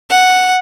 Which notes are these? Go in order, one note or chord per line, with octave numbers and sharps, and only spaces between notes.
F#5